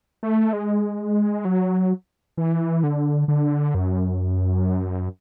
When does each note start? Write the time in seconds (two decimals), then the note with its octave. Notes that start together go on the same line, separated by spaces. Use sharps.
0.23 A3
0.53 G#3
1.45 F#3
2.37 E3
2.83 D3
3.28 D3
3.74 F#2